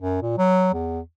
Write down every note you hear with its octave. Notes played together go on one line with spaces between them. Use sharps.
F#2
A#2
F#3
E2